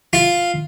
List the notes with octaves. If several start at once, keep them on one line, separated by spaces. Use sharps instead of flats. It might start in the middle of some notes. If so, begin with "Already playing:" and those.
F4